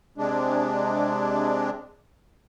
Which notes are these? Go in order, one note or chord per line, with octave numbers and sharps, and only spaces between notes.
C3 G#3 D4